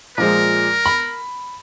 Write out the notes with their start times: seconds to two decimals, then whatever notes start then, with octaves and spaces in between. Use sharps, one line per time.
0.18 A#2 F3 G#3 A#4
0.86 B5